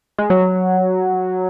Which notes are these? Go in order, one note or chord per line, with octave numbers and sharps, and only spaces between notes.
G#3
F#3